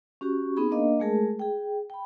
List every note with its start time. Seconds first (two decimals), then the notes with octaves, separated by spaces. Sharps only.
0.21 C#4 F#4 G4 C#6
0.57 B3 C4 D#4 G#4 B5
0.71 A#3 D4 A#4 D#5 F5
1.00 G#3 A3 G#4 A#4 A5
1.39 G#4 G5
1.90 G5 B5